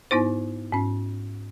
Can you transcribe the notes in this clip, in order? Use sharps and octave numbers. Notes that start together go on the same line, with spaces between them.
G#2 B3 D#4 E4 C5
G#2 C#4